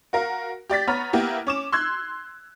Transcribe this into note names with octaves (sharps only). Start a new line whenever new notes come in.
F#4 A#4 F5
G4 D5 A6 B6
B3 C#5 A#5 B5 F6
A#3 B3 E4 G4
C#4 D6 E7
C6 E6 F#6 G#6